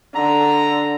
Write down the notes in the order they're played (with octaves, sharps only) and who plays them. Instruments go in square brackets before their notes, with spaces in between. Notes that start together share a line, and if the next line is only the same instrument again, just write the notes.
[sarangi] D3 [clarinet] A#5